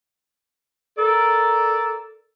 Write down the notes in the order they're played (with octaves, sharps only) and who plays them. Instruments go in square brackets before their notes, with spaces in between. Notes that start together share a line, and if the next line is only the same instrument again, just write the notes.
[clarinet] A4 [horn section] A#4 D5